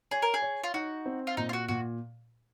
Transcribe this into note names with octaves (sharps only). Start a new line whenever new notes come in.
G#4 C#5
A#4
G#4
C#5
F4
D#4 F#4
C4
F4
A#2 D#4
F4
F#4
A#2 F#4